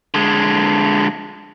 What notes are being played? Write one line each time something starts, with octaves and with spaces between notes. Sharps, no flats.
D3 G#3